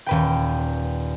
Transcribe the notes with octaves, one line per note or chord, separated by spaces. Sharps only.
D#1 B4 G5